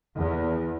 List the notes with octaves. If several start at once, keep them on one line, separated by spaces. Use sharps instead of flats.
E2